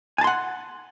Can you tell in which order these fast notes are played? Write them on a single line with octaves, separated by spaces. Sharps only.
G#5 A5 C6 F#5